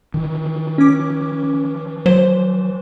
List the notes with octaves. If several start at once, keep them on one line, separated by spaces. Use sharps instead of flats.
D#3 E3
C#4 D6
F#3 C5